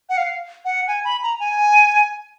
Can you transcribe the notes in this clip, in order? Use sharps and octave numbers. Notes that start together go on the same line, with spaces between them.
F#5
F5
F#5
G#5
B5
A#5
G#5